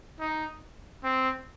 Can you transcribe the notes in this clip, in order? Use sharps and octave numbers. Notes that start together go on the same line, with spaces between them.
D#4
C4